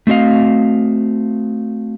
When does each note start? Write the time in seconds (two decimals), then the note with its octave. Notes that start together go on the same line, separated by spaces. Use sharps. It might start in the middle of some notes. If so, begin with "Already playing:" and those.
0.07 A3 C4 F#4 D#5 F5